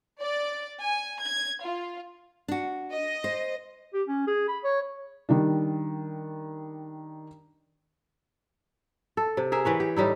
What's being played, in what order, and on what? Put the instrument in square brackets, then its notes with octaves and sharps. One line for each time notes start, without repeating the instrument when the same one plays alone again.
[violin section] D5
G#5
G#6
F4
[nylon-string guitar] D4 F#4
[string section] D#5
[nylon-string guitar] C5
[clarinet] G4
C#4
G#4
B5
C#5
[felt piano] D#3 G3 D4
[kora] A4
C3
G#4 A#4 E5
E3 B4 C#5
G4
A2 G3 D#4 E4